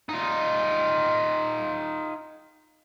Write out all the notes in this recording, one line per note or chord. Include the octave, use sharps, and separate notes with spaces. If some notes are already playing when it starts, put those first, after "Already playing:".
D#4 F4